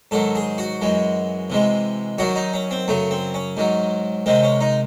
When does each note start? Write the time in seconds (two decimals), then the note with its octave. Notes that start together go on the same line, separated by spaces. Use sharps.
0.11 G#2 D#3 F#3 A4
0.35 G#4
0.58 F#4
0.82 F#2 E3 G#3
1.50 C3 E3 G#3
2.18 F#2 D#3 F#3 F#4
2.36 D#4
2.53 C#4
2.71 C4
2.88 F#2 C#3 F#3 A3
3.11 C4
3.34 C#4
3.57 G#2 D#3 F#3
4.26 C3 D#3 G#3 C4
4.43 C#4
4.61 D#4